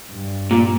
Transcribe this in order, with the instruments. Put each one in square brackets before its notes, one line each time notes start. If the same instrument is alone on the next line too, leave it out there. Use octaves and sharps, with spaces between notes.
[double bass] G2
[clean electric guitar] A#2